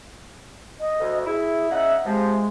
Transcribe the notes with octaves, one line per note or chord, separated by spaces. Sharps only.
D#5
D2
E4 G#4
C#3 D#4 E5 F#5
C3 F3 G#3